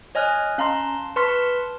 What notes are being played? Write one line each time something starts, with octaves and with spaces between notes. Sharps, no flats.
C#5 D#5 G#5 F6 F#6
C#4 F5 A5 A#5 C6
B4 A5 C6 C#6 F6 B6